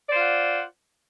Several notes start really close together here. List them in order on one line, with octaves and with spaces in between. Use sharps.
D5 C5 F4 F#5